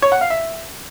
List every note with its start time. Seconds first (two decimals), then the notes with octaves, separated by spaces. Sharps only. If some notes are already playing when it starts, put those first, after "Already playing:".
0.02 C#5
0.12 F#5
0.21 F5
0.30 E5